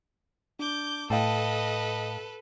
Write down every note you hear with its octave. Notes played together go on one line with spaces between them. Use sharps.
D4 D6 G6
A2 A4 B4 D#5 F5 G5 A5